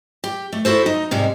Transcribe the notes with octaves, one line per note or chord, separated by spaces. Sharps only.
G4
A3
E4 F#4 A4 C5
D#4
G#2 C3 G3 G#3